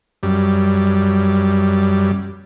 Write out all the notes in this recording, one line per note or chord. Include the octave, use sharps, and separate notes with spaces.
F#2 G3